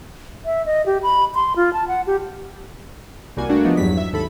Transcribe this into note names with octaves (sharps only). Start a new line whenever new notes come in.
E5
D#5
G4
B5
C6
F4
A5
F#5
G4
C2 G3 A#3 F#4 G#5
G3 A3 A#3 D4 F#4
E3 F3 B3 D4 D#4
E2 G2 F#3 B6
E5
G#1 D#2 A4 B5